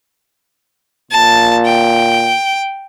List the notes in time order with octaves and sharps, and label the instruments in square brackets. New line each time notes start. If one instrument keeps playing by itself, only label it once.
[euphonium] A#2 [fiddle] A5
[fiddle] G5